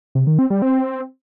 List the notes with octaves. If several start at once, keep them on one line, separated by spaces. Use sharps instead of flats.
C3
D#3
C4
G3
C4